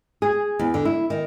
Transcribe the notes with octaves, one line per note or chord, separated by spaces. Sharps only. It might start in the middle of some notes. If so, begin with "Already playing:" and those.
G#4
E2
D3
E4
D#3